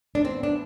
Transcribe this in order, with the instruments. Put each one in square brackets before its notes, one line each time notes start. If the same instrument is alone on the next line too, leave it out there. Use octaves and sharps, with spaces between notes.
[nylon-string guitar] D4
[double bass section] A2 E3 B3 [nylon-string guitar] C4
[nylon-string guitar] D4